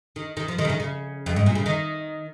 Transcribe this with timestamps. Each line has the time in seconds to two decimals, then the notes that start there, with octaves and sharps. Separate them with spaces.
0.16 D#3
0.37 D#3
0.48 F3
0.58 D#3
0.65 C#3
0.70 D#3
0.80 C#3
1.26 F2
1.36 G#2
1.46 A#2
1.55 C#3
1.66 D#3